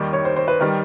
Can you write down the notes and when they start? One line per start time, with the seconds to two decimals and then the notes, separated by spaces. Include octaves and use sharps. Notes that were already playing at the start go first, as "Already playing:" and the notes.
Already playing: D#2 D#3 G3
0.13 C#5
0.25 C5
0.36 C5
0.48 B4
0.60 D#3 G3 A#4